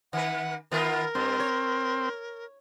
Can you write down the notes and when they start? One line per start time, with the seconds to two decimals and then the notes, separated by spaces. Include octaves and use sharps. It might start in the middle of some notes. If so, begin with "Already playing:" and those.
0.13 D#3 B4 F#5
0.71 D#3 B3 F4 A#4
1.15 G2 C4
1.40 C#5